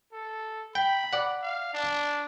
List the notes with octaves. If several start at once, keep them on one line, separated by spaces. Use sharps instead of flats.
A4
G5 B5
D5 F#5
F5
D4